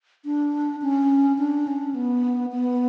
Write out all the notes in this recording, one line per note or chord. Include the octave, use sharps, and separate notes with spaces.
D4
C#4
D4
C#4
B3
B3